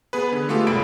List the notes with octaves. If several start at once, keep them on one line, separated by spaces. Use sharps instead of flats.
B3 G#4 B4
D3
G#3 A3 F4 G4 A4
G1 C2 A#2 B5 D7